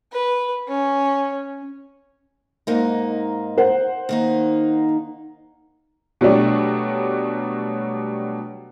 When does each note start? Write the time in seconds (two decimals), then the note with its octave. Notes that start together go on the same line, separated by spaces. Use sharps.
0.12 B4
0.68 C#4
2.67 G#2 A#3 D#4
3.58 C5 F#5
4.09 D#3 A#3 D#4
6.21 B2 F#3 G3 A3 D4 G4